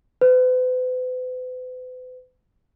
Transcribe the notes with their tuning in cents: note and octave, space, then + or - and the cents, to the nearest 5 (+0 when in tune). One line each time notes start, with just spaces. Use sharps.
B4 +45